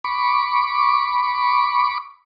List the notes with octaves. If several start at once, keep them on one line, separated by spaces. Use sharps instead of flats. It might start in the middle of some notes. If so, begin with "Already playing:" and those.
B5 C#6 D6